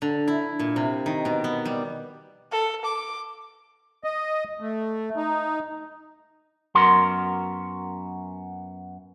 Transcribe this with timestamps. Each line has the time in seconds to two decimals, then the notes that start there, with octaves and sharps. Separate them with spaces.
0.02 D3
0.27 E4
0.59 A#2
0.76 C3
1.06 D#3
1.25 B2
1.44 B3
1.65 G3
2.51 A4
2.85 D6
4.04 D#5
4.61 A3
5.17 D#4
6.75 F#2 B3 F#4 A#4 C6